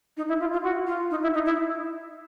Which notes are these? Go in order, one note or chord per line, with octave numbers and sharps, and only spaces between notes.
D#4
E4
F4
F4
F#4
F4
D#4
E4
D#4
E4